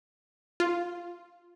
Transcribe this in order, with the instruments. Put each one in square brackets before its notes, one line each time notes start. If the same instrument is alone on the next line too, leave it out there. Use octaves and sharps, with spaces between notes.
[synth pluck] F4